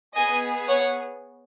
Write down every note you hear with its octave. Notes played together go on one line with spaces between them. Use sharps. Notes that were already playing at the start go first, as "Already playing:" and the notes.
B3 G#4 D#5 G#5
C#5 F#5